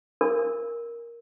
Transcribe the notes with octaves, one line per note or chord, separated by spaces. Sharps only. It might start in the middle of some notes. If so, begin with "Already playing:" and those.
A#4